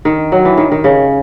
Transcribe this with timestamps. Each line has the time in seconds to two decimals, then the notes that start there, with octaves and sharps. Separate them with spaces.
0.05 D#3
0.32 F#3
0.45 E3
0.58 D#3
0.72 D#3
0.84 C#3